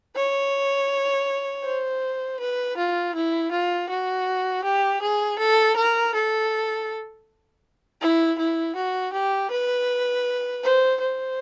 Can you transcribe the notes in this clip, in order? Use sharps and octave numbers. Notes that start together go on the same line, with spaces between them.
C#5
C5
B4
F4
E4
F4
F#4
G4
G#4
A4
A#4
A4
E4
E4
F#4
G4
B4
C5
C5